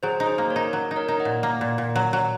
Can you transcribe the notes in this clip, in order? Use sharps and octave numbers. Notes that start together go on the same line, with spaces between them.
F#3 G#4 C5
D#4
G#4 C5
A#3
A#4 C#5
D#4
F#3
D#4
A#4 C#5
D#4
D#5 F#5
A#2
A#3
A#2
A#2
F#3
F#3